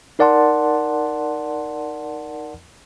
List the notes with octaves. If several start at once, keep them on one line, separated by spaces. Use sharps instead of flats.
D#4 A#4 D5 F#5 A5 C6